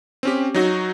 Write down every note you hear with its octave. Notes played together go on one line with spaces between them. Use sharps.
C4 C#4 G4
F#3 D#4 F#4